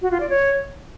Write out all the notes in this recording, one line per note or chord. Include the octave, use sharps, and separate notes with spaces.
F#4
F4
D5
C#5